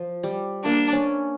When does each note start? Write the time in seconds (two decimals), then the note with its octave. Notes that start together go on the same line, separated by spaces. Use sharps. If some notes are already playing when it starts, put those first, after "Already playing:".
Already playing: F3
0.23 G3
0.64 A#3 D4
0.93 C#4